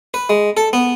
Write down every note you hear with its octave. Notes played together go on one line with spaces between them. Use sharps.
B4
G#3
A4
B3